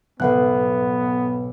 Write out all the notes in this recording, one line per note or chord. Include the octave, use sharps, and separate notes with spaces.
B1 G#2 B3 A4 B4 F#5 F#6